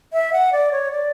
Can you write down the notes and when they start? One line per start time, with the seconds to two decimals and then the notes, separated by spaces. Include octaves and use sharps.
0.13 E5
0.33 F#5
0.52 D5
0.72 C#5
0.92 D5